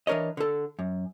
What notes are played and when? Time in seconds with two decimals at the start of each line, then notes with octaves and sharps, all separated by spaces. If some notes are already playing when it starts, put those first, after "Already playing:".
0.07 E3 D4 A#4 C#5 D#5
0.37 D3 A4
0.79 F#2